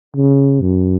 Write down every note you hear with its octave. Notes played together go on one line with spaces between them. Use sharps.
C#3
F#2